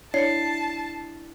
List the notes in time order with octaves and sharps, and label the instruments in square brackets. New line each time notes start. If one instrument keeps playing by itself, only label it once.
[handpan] D4 E4 [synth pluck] C#5 [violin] A5 [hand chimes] C7 C#7